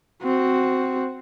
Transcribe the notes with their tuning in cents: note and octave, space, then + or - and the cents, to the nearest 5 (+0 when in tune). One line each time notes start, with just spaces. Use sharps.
C4 -5 F#4 +0